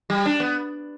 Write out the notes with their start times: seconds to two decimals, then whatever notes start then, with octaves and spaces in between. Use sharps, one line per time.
0.10 G3
0.26 D4
0.40 B3